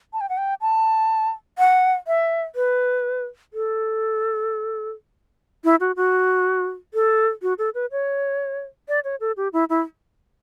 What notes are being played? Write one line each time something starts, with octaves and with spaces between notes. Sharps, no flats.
A5
G5
F#5
G5
A5
F#5
E5
B4
A4
E4
F#4
F#4
A4
F#4
A4
B4
C#5
D5
C#5
A4
G4
E4
E4